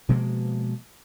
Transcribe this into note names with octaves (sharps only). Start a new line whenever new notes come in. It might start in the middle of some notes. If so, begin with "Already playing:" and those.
B2 F3 G#3 A#3